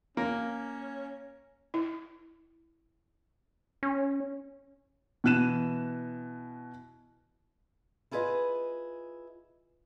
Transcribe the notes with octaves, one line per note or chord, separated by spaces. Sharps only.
A#3 C#4
E4
C#4
B2 E3 F#6 D#7 E7
E4 F4 G#4 B4 D#5